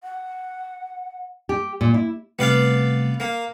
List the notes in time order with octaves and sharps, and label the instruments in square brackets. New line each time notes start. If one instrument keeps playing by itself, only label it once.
[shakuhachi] F#5
[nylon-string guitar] G4
A#2
E4
[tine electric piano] C3 G3 A3 [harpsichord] B3 D5 F5
[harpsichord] A#3